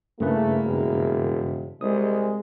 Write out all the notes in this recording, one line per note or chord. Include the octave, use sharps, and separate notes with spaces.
G2 C#3 A3 A#3 E4 G#4 B4
E1
C2 G#3 D#6